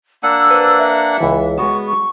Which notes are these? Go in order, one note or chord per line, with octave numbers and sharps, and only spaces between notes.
A#3 D4 F#5 G#5 E6
B4 C5
E5
C#2 E3
G#3 B3 F#4 A5 C#6
C#6